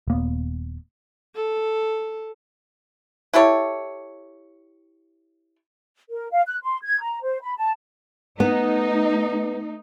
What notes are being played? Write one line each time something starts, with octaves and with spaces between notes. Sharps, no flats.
D#1 A#3 B3
A4
E4 G4 A4 C#5
A#4
F5
F#6
C6
G#6
A#5
C5
B5
A5
A3 B3 D#4